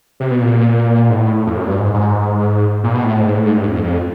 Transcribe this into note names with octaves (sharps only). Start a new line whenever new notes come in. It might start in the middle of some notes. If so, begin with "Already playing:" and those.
C3
B2
A#2
G#2
A2
F2
F#2
G2
G#2
G#2
A#2
B2
A2
G#2
A2
G#2
G2
F2
F2